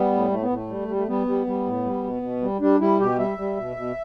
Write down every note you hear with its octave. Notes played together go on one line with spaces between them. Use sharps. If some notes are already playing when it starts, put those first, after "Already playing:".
Already playing: G3 B3
A2
A2 A3
B3
A2 A3
G3
G3
A3
G3 B3
G3
G3
A2
G3
B2
B2
G3
G3 D4
G3 E4
B2 G4
G3 E5
G3
B2
B2